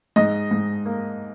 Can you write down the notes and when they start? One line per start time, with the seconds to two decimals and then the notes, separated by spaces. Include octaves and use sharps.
0.16 G#2 D#5
0.51 G#2
0.85 A#3